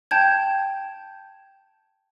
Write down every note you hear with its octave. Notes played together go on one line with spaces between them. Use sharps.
G5 A5 G6 G#6